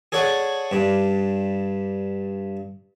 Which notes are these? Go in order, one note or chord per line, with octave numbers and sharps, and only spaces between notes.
G#4 A4 C#5 D5 F#5
G2 D4